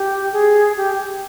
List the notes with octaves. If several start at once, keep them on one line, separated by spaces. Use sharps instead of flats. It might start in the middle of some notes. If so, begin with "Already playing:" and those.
Already playing: G4
G#4
G4